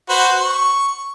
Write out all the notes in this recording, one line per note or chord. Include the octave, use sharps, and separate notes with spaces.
F#4 B4 C5
C#6